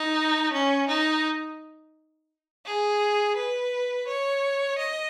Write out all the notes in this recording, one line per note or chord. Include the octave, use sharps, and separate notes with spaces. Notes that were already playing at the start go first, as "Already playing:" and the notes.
Already playing: D#4
C#4
D#4
G#4
B4
C#5
D#5